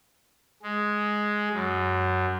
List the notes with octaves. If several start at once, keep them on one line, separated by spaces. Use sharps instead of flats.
G#3
F#2